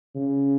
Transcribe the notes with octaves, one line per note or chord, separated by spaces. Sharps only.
C#3